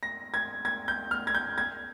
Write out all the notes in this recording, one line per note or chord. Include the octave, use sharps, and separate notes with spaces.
A#6
G#6
G#6
G6
F6
G#6
G6
G#6